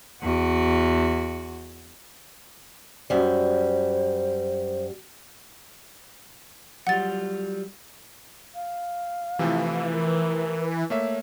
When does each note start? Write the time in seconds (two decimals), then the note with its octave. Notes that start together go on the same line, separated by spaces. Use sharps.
0.22 E2 F#4
3.10 F#2 G3 C5
6.87 F#3 G3 F4 F#5 A6
8.55 F5
9.39 C3 E3 F3 A3
9.92 A#4
10.90 A3 A#3 C#5 E5